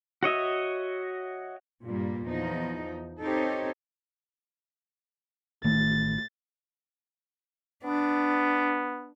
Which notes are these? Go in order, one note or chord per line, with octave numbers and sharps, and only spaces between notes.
F#4 C#5 D#5 E5
G2 A#2 G3 A#3
E2 F3 D#4
C4 D#4 G4 A4 C5 C#5
A1 A2 D#3 A3 A6
B3 D4